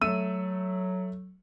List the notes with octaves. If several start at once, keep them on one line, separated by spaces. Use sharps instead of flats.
F#3 A3 E6 D#7